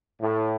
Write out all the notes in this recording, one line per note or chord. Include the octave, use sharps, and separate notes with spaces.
A2